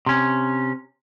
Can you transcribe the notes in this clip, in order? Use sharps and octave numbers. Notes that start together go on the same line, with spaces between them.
C3 C#4